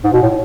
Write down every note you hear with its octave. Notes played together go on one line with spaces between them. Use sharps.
G#2
B2
A2